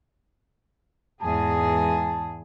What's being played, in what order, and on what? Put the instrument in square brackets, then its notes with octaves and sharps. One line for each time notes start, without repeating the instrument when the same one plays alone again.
[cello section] E2 G#2 G#4 [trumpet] A5